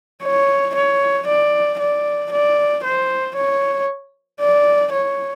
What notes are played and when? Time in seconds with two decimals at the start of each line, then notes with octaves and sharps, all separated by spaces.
0.23 C#5
0.75 C#5
1.27 D5
1.79 D5
2.32 D5
2.84 C5
3.36 C#5
4.40 D5
4.93 C#5